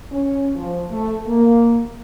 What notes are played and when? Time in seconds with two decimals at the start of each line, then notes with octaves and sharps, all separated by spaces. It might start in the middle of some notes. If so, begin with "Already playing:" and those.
0.12 C#4
0.55 F3
0.91 A3
1.27 A#3